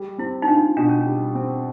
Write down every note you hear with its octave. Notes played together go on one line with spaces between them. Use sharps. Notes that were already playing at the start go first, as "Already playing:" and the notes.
Already playing: G3
C4 E4
D#4
D4 F4
B2 D4
C#4
G3 D4
C4